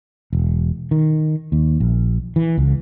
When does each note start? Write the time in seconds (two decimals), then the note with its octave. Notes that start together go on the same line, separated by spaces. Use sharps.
0.33 E1
0.91 D#3
1.52 D#2
1.80 A#1
2.36 E3
2.58 C#2